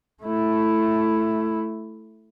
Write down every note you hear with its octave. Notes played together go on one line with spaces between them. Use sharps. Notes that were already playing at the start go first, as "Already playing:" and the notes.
A3 E4